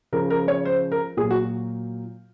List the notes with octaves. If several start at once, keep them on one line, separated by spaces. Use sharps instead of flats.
C#3 F3 A#4
A#4
C#5
C5
A#4
A#2 F#3 G#4
F#4